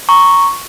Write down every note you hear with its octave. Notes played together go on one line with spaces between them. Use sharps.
A#5 C#6